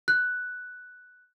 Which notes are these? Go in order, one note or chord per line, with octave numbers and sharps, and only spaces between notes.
F#6